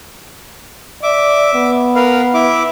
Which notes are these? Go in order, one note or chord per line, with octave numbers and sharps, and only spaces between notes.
D5 E5 D6
B3
A#4 B4 F5
E4 E5 D6